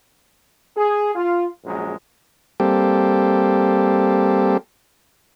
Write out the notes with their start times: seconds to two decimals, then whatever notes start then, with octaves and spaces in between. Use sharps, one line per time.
0.76 G#4
1.15 F4
1.64 A#1 F#2 G#3
2.60 G3 A#3 C4 G4 A4